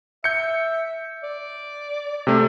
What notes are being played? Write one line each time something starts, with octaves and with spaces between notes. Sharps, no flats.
E5 G6 C#7
D5
C3 A3